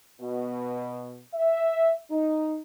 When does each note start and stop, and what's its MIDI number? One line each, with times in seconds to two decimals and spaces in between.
0.21 1.21 47
1.34 1.93 76
2.11 2.60 63